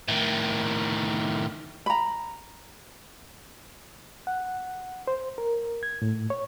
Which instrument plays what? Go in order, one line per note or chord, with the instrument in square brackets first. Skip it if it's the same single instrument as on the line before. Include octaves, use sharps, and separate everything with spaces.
[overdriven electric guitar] A2 D#3
[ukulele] A#5 B5
[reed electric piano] F#5
C5
A#4
G#6
A2
C#5